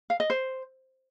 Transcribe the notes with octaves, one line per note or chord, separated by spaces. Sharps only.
F5
D#5
C5